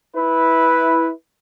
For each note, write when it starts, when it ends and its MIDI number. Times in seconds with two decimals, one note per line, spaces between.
0.15 1.10 64
0.15 1.10 71